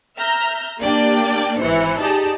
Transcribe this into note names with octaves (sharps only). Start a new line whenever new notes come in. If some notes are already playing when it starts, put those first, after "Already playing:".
E5 A#5 F6 G6
A#3 D4 G4 D5 G5
G#1 E3 C5 C#7
D#4 G4 G#4 D5 A5